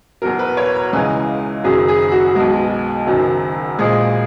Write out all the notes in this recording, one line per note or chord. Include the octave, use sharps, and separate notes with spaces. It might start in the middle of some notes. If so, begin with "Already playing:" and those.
E2 B2 F#3 A#4
B4
C#5
A#5
C#2 C#3 E3 G#3 G#5
F#1 F#2 D#3 F#3 G#4
G#4
F#4
B1 B2 G#3 F#4
F#1 F#2 D#3 F#3
A#1 A#2 G#3 G#4